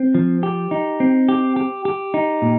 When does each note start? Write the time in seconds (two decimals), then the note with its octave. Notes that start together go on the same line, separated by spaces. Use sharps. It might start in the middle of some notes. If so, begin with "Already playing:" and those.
Already playing: C4
0.15 F3
0.43 G4
0.71 D#4
1.00 C4
1.29 G4
1.56 G4
1.85 G4
2.14 D#4
2.42 A#2